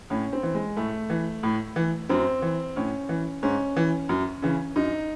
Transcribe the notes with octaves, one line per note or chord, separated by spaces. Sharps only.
A2 C#4
C4
E3
G#3
A2 A3
E3
A2
E3
F#2 C4
E3
A2 C#4
E3
G#2 C#4
E3
F#2
C#3 E3
F#2 D#4